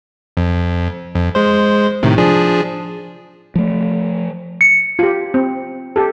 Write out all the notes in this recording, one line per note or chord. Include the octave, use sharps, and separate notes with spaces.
F2
F2
G#3 C5
A2 C3 D#3
F3 D4 G#4
F3 A3
C#7
F4 G4
C4
G4 A4